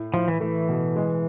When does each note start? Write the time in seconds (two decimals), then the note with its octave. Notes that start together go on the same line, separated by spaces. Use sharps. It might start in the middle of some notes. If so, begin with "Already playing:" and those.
Already playing: A2
0.13 A2 F3
0.28 E3
0.40 E3 A3
0.69 B2
0.96 G#3